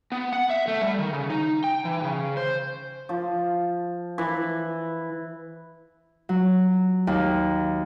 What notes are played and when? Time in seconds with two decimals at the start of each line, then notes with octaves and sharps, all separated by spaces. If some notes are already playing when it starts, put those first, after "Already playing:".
0.12 B3
0.33 F#5
0.50 E5
0.68 A3
0.82 G3
0.99 D#3
1.13 C#3
1.30 D#4
1.64 G5
1.85 E3
2.04 C#3
2.37 C5
3.09 F3
4.18 E3
6.29 F#3
7.07 D#2